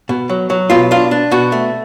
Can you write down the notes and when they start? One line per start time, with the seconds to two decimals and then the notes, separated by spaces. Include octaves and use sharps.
0.09 B2
0.29 F#3
0.50 F#3
0.70 B2 F4
0.91 D4 F4
1.11 D4
1.31 B2 F#4
1.52 A3